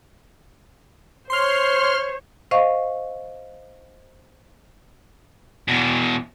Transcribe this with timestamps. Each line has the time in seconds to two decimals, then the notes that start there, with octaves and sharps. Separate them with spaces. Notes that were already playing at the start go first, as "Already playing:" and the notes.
1.30 C5 C#5 C6 F6
2.51 C5 D#5 F5 C#6
5.68 E2 B2